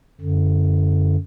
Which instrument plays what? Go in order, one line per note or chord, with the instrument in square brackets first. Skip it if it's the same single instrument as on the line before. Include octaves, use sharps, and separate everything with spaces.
[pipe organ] F#2 D3